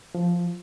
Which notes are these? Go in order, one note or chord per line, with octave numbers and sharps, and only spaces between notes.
F3